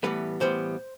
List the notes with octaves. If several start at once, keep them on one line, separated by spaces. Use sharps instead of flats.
A2 E3 G3 B3 B4
A2 E3 G3 B3 C5